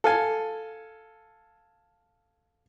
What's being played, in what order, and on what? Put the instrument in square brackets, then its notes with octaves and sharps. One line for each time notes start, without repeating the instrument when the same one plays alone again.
[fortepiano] A4 F5 G#5